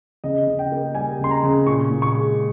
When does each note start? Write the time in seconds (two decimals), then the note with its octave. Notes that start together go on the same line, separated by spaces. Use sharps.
0.24 C#3 D#5
0.47 C#3
0.59 G5
0.72 A#3
0.95 G3 G#5
1.19 C#3 C6
1.31 A#5
1.43 C#3
1.67 A#2 C#6
1.91 A#2
2.02 C#6
2.14 G#3